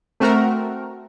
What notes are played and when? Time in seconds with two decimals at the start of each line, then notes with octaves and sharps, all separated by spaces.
0.20 A3 C4 F#4 A#4